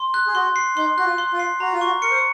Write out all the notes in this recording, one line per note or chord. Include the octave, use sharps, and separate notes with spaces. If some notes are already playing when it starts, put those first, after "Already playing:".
Already playing: C6
F#6
G#4
F#4 C6
C7
D#4 C6
F#4 F#6
F4
C6
F4
C7
F#4 A#5
F4
F#4 C#6
A#4 C#7
C5